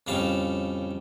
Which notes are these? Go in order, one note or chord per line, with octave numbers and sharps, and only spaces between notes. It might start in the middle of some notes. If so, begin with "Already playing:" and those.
F2 A2 C#3 G3 F5 A5